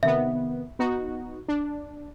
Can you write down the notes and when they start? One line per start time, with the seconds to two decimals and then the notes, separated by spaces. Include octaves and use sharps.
0.03 C3 D#3 B3 E5
0.79 B3 D#4 F#4
1.48 D4